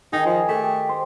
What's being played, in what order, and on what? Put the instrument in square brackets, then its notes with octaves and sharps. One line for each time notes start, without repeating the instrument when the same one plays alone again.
[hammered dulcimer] D#3 G#4 [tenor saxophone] D#4
[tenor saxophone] F3
[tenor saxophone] A3 [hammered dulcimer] G4
[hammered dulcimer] C5